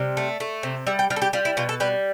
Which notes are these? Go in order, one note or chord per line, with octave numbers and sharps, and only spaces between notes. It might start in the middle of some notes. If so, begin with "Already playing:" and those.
Already playing: C3 G3
A3
A3
C3
G3 E5
G5
G3 F5
A4
G4
G3 F4
E4
B2 F4
A4
G3 B4